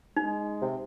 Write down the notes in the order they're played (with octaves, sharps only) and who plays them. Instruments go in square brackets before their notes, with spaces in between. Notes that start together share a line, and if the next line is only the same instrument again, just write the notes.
[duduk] G#3 [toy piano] D#4
[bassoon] C3